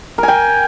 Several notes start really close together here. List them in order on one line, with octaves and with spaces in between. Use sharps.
A#4 G#5 G5